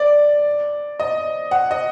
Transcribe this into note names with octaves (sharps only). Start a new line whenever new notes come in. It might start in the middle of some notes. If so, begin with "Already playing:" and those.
Already playing: D5
D#5
F#5
D#5